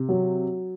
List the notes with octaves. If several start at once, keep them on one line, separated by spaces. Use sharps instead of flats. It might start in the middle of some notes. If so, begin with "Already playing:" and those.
Already playing: C3
F#3